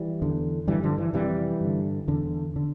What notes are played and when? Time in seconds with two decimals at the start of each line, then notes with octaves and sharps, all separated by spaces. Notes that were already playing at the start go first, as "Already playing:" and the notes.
Already playing: E3 G3
0.22 E2 D3
0.67 G2 D3 E3 G3
0.83 D3 F3
0.98 E3
1.14 F2 C3 E3 G3
1.61 G2 D3
2.08 E2 D3
2.56 D3